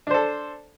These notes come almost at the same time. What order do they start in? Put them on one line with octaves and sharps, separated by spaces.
D4 C5 A4